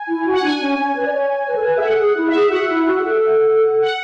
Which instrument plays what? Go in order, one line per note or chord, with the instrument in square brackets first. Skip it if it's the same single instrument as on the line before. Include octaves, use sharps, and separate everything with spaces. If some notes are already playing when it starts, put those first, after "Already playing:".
Already playing: [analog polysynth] G#5
[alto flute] E4
F#4
[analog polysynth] F#5
[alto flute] D4 [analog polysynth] G#5
[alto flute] C#4
C#4
B4
D5
C#5
B4
A4
B4
[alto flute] G#4 [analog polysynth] E5
[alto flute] A4 [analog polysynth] F#5
[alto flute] G#4
[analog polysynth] F#5
[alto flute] E4
[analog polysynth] E5
[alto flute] G#4
[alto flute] F#4 [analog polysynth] F#5
[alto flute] E4
F#4
G#4
A4
[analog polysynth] F#5